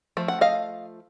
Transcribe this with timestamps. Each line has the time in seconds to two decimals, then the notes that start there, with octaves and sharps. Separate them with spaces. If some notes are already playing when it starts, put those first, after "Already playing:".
0.17 F3 A3
0.28 F#5
0.41 D#5 F5